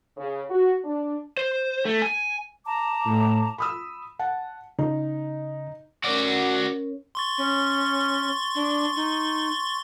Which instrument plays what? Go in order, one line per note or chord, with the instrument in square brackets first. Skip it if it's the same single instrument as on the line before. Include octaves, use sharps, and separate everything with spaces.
[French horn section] C#3
F#4
D4
[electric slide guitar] C5
A3
G#5
[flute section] A5 A#5 D6
[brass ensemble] A2
[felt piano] B5 D#6 E6
F#5 A5
[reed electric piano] C#3 [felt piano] D#4
[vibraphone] C#4 A#4 C#5 [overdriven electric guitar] F#4 D5
[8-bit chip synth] C6 C#6 A6
[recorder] C#4
D4
D#4